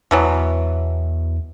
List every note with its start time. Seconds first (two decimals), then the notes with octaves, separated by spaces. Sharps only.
0.11 E2 B2 E3 F#3